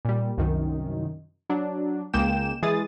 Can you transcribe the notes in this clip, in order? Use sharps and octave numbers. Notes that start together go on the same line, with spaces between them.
A#2 G3
C2 F#2 D#3
F#3 D4
C#2 G#3 A#3 G5 E7
E3 G#3 G#4 D#6 A6